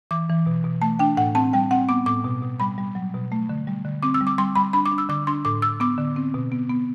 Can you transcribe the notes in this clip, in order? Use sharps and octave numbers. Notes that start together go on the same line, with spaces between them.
E3 D6
E3
B2
B2
A3 A5
D4 G5
A2 F#5
C4 A5
G3 G5
C4 F#5
B3 D6
A2 D6
B2
B2
G3 B5
G3
F#3
B2
A3
D3
G3
D3
C4 D6
E6
G3
D6
G3 C6
G3 B5
D4 B5
D6
D4
E6
D3 D6
D4 C6
A2 D6
A2 E6
B3 D6
D3
C4
B2
B3
B3